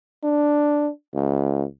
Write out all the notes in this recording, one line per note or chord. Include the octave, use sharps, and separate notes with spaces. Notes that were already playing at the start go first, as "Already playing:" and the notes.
D4
C#2